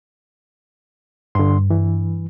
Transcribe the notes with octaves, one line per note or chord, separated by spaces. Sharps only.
G2 D3 C6
E3